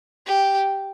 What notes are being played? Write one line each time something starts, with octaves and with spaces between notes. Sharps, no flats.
G4